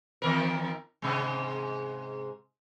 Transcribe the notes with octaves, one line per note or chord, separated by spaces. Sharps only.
E2 D#3 A#4
G#2 C3 G#3